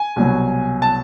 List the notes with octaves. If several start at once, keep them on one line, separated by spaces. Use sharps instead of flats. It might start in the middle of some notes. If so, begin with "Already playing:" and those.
Already playing: G#5
C2 B2 F#3
A5